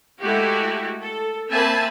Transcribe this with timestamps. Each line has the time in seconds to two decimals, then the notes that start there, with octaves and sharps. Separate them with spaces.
0.20 G#3 A3 E4 F#4 G4
1.00 A4
1.49 A#3 C4 E5 G#5 A5 B5